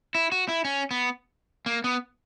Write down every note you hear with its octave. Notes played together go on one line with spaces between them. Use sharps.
E4
F#4
E4
C#4
B3
A#3
B3